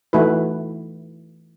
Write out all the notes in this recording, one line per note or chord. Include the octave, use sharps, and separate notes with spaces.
E3 A3 D#4 E4 F#4 B4